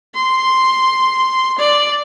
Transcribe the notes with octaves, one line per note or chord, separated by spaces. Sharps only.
C6
D5